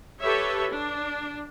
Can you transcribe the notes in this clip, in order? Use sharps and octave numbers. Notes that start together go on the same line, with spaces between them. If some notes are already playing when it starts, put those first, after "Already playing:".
G4 A4 B4 C#5 E5
D4